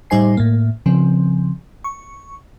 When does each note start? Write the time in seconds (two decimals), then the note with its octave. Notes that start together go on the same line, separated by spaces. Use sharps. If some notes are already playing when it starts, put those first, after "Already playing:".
0.10 A2 G3 D#4 C5 G#5 C7
0.37 A2 A#3
0.86 C#3 F3 C4
1.84 C#6